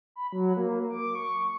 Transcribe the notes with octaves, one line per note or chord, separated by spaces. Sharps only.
B5
F#3
A#3
D6
C#6